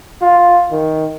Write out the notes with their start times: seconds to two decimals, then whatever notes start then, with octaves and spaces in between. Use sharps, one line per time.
0.21 F4
0.71 D#3